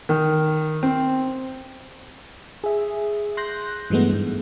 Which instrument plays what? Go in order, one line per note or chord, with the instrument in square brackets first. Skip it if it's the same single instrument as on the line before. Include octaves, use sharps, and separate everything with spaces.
[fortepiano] D#3
C4
[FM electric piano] G#4 E5
C6 F#6 G6 A#6
G2 E3 F#3 G#3 A3 B3
G#2